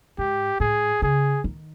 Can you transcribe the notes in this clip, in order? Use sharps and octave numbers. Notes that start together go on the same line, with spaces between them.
G#2 G4
A2 G#4
C#3 G#4
D#3